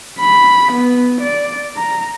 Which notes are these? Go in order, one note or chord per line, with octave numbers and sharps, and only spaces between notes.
B5
B3
D5
A#5